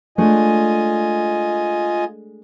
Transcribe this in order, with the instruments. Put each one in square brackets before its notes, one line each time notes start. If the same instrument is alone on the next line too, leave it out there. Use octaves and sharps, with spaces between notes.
[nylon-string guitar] G#3 A3 D4 [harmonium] F4 D#5 G#5